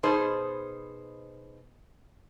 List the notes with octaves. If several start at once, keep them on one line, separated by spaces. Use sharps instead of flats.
B2 D#4 G#4 C5